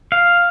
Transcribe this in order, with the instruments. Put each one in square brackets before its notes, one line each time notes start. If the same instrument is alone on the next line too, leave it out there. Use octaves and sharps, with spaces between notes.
[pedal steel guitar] F5